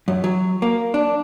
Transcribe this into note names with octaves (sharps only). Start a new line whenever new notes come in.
F#2
F#3
A#3
D4